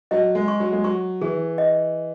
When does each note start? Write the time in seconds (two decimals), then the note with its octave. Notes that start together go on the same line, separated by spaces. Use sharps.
0.11 F#3 D#5
0.35 G#3
0.48 C#6
0.60 F#3
0.72 G#3
0.84 F#3 C#6
1.21 E3 G#4
1.58 D#5